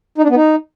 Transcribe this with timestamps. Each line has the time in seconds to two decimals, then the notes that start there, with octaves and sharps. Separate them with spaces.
0.18 D#4
0.24 D4
0.30 B3
0.36 D#4